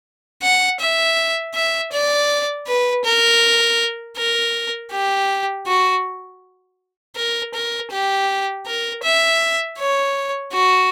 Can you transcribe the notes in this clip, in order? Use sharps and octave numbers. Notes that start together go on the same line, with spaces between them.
F#5
E5
E5
D5
B4
A#4
A#4
G4
F#4
A#4
A#4
G4
A#4
E5
C#5
F#4